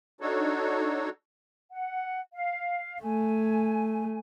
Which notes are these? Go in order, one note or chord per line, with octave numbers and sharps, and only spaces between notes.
D4 D#4 F#4 A4 C#5
F#5
F5
A3 G#5